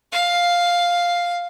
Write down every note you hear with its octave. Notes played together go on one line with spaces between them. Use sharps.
F5